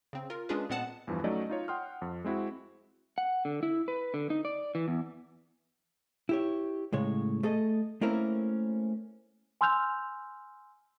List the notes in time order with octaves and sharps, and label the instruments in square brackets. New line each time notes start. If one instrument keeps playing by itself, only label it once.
[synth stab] C#3 C4
F4 A#4
G#3 C#4 D4 F4 G#4 B4
A#2 G#3 B3 C4 F#5 A5
[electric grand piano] E2 G2 E3 F3
F#3 A3 C#4 D#4 D5 D#5
D#4 F4 C#5
F#5 G5 C6 D#6 F6
F2
G#3 C4 E4 F#4
[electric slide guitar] F#5
D3
E4
B4
D3
D#4
D5
E3
E2
[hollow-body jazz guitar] E4 G4 C#5
A2 C#3 G#3 C#5
A3 G#4 A4 D#5
A3 A#3 C4 C#4 E4 A#4
[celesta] G#5 C6 E6 F6 G6 F7